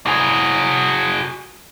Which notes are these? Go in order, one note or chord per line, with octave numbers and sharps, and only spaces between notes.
F#4 G#4